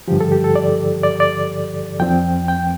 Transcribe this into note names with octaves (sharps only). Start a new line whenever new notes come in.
G2 D3 F3 G4
A4
G4
A4
D5
D5
D5
F2 F3 C4 G5
G5